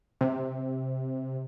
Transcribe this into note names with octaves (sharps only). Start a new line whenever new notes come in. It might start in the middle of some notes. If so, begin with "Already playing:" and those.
C3